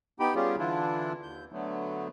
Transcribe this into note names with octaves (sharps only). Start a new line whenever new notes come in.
B3 D#4 G4 G5 B5
G3 B3 C#4 F4 G4 G#4
D3 E3 D4 E4 F4
D#2 G6
D3 F#3 A3 B3